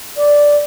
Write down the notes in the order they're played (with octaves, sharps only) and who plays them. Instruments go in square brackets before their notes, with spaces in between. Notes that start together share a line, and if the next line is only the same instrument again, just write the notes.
[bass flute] D5